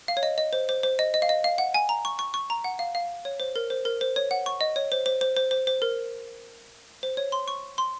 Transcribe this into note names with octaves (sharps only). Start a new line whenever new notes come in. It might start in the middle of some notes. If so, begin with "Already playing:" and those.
F5
C#5
D#5
D#5
C5
C5
C5
D#5
D#5
F5
D#5
F5
F#5
G#5
A#5
C#6
C#6
C#6
A#5
F#5
F5
F5
C#5
C5
A#4
C5
A#4
C5
C#5
F#5
C#6
D#5
C#5
C5
C5
C5
C5
C5
C5
A#4
C5
C#5
C6
C#6
C6